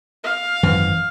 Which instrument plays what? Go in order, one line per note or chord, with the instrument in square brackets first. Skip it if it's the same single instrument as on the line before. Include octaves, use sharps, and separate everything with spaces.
[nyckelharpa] F5
[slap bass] G#1 F#2 E3